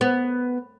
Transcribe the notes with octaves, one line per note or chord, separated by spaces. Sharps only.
B3